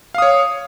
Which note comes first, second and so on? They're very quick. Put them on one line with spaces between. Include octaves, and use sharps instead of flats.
F5 D#6 C#5